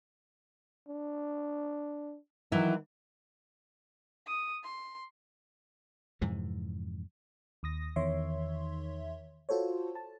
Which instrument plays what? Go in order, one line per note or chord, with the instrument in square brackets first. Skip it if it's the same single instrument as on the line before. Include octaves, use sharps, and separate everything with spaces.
[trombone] D4
[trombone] D#3 [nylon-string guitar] E3 F#3 E4
[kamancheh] D#6
C6
[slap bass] F2 G#2 C3 E3
[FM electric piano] D#2 D#6 A#6
E2 D#3 C#5 E5 C6
F4 F#4 A4 C5 C#5
A5